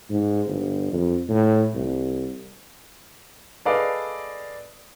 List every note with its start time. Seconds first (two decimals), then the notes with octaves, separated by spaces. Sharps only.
0.11 G#2
0.47 G1
0.93 F2
1.29 A2
1.74 C2
3.65 G#4 A4 B4 D5 D#5 F5